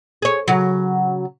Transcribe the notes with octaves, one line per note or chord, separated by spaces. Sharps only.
G#4 C#5
C#3 F#3